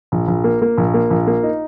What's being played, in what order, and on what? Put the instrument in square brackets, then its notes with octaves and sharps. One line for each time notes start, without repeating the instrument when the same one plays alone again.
[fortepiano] A#1
A#1
A#3
A#3
A#1
A#3
A#1
A#3
D#4